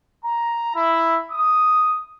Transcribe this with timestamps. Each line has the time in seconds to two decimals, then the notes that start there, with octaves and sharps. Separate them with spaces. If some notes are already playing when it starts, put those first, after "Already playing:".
0.24 A#5
0.75 E4
1.32 D#6